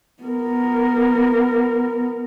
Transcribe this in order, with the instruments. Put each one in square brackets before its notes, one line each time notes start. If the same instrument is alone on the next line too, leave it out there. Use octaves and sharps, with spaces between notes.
[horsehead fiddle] B3 A#4